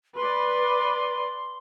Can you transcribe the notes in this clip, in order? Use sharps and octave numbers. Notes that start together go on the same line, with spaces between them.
B4 D5 C6